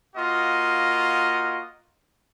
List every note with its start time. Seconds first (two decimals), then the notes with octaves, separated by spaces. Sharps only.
0.16 A#3 F4 F#4 D#5